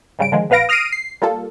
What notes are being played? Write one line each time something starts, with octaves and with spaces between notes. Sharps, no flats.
G#2 C#3 G3 D7
D3 D#3 F3 G#3
A#1 B3 B4 F5 A#6 D7
D#6 F6 A#6 C7 D7 D#7
C7
G3 A#3 F4 A4